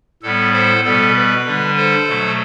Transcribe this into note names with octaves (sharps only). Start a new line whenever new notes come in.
A2 G3 B3 A4
A4 C5
B2 G3 B3 A4
B4
D3 G3 D4
A4 C5
B2 F#3 A3